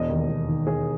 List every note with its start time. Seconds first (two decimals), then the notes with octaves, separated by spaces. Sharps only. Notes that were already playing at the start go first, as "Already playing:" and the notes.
Already playing: E1 D#5
0.09 D#2
0.29 E1
0.49 D#3
0.67 E1 G#4